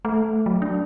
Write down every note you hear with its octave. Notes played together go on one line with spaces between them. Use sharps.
A3
F#3
D4